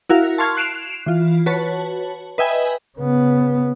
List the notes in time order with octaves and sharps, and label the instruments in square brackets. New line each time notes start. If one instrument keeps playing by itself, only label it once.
[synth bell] E4 F#4 A#4 F5
A5 C6 C#6 F6 G#6
F#6 C7 D7 E7 F7
E3 F4
F#4 B4 C#5 A5
B4 D#5 E5 G5 G#5
[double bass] C#3 B3